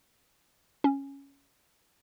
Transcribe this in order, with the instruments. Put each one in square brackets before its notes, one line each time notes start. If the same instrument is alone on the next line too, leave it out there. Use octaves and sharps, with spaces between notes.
[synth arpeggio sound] C#4